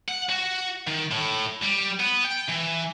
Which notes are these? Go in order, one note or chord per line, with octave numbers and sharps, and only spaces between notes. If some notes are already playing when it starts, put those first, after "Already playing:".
F#5
F#4
D#3
A2
G3
B3
G5
E3